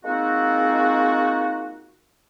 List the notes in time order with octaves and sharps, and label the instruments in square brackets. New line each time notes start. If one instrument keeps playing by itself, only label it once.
[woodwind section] G#3 A#3 C4 D#4 F4 F#4